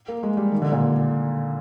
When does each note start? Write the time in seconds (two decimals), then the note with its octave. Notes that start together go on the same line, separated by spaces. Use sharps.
0.08 A#3
0.23 G#3
0.37 G3
0.52 D#3
0.62 D3
0.72 A#2